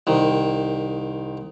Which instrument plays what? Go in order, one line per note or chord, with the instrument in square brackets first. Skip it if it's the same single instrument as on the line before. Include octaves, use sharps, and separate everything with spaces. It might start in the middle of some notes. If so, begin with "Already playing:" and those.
[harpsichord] C2 D#3